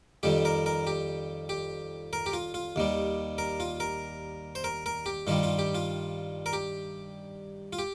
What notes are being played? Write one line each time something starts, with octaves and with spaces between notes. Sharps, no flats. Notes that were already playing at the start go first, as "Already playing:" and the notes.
F2 D#3 G3 G4
A#4
A#4
G4
G4
A#4
G4
F4
F4
D#2 D#3 G3
A#4
F4
A#4
C5
A#4
A#4
G4
G2 D#3 G3 F4
F4
G4
F4
A#4
G4
F4
G4